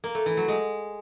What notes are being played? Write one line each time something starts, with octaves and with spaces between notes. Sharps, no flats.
A#3
A3
E3
F#3
G#3